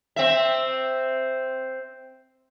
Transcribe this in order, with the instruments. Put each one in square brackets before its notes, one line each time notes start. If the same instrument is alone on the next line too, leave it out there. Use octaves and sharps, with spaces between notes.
[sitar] C4 E5